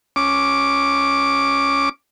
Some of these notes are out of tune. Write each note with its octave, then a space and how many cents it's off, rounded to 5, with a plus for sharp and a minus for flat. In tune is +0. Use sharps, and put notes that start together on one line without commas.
C#4 +0 D6 +0